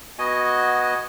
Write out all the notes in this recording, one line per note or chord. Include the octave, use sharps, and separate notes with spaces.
B3 F#4 D#5 G#5